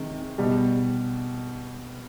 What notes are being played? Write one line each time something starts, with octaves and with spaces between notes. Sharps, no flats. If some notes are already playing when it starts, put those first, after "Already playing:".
Already playing: C3 D#3 G#3
B2 G3